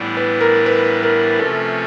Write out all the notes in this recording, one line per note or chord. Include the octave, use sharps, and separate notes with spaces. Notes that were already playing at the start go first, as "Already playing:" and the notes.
Already playing: A2 E3 G3 B3 D4
B4
A#4
B4
A#4
C3 F3 A3 C#4 A4